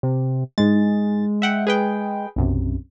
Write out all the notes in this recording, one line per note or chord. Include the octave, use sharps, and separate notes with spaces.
C3
G#2 G#3 A6
E5 F#5 G5
G#4 B4 G5
B1 F#2 C3